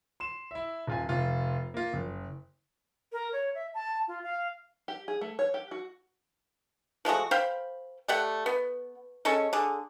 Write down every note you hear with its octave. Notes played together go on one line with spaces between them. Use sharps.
C6 E7
E4 E5
D#1 F4 G#5
F1 F4
A#3 F4
F#1
A#4
C#5
E5
A5
F4
F5
G4
G#4
A3
C#5
G4
F#4
F3 G#3 A3 F#4
C5 F5 G5 B5
G3 A3 G4 F#5
B3
G#3 C#4 A4 C#5
D3 G#4